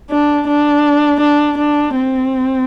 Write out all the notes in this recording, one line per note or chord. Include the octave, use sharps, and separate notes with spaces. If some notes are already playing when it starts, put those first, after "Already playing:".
D4
D4
D4
D4
C4